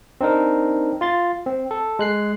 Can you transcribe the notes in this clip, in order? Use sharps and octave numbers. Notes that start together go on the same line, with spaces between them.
C4 D4 D#4 A#4
F4 C6 A6
C4
A4
G#3 F#6 C7